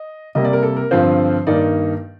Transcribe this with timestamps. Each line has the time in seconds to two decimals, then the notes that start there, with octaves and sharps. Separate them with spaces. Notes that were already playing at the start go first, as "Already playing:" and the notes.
Already playing: D#5
0.35 C3 G3 A#3 D#5
0.45 D5
0.53 A#4
0.63 A4
0.77 A#4
0.91 G2 D3 F3 C4 F4 C5
1.47 G2 D#3 A#3 D#4 D5